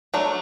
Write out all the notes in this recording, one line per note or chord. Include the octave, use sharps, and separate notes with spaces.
F#3 A3 D4